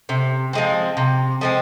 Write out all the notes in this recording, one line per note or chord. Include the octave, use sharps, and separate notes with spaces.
C3
F3 G#3 C4
C3
F3 G#3 C4